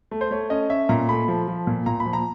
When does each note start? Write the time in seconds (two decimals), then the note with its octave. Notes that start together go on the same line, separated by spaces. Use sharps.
0.11 A3
0.21 C5
0.31 A3 C#5
0.50 C#4 D#5
0.70 C#4 E5
0.89 A#2 A#5
1.09 A3 B5
1.28 F3
1.48 F3
1.67 A#2
1.86 A#2 A#5
2.00 B5
2.06 F3
2.13 A#5